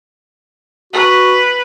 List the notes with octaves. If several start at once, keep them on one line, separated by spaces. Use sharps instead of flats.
F#4 B4